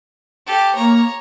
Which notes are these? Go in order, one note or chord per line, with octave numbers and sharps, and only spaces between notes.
G4 A4
A#3 C#5 A#5